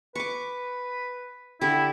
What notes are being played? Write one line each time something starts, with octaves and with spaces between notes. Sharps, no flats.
B4 C#6 D6
D3 E4 G4